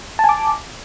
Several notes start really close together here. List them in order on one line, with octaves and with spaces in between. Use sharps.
A5 G#5 D6